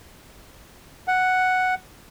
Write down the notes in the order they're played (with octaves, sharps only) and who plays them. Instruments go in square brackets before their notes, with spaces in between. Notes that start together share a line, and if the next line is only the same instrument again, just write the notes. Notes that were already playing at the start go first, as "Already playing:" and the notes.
[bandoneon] F#5